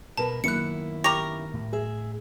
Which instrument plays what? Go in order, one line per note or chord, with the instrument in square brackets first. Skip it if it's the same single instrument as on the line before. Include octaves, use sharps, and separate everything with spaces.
[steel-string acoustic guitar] B2 A#4 B4 [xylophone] A5
[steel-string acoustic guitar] F#2 A#3 E4 [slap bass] D#3 B3 [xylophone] F#6 C#7
[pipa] G4 A#4 [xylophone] C#6 A#6 F7
[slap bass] A2
[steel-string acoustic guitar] G#4 E5